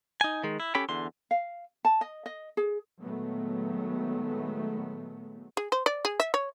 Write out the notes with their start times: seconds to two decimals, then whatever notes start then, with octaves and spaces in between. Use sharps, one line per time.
0.21 D#4 G#5
0.43 D#3 G#3
0.60 E4
0.75 C#4 G4 A4 C#5 G5 B5
0.89 E2 D3 C6
1.31 F5
1.85 A5
2.01 D#5
2.26 D#5
2.57 G#4
2.99 A#2 D#3 F#3 G#3 A3 B3
5.57 G#4
5.72 C5
5.86 D5
6.05 G#4
6.20 E5
6.34 C#5